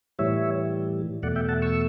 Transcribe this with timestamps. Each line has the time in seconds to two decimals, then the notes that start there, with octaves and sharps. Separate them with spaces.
0.19 A2 E3 G3 C#5 E5
1.23 E2 B2 A3 D5 F#5
1.36 E5 G5
1.48 F#5 A5
1.62 C#6 E6